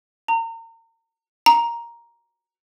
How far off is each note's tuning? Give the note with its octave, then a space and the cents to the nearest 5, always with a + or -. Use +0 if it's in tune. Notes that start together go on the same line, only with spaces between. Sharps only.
A#5 -35
A#5 +5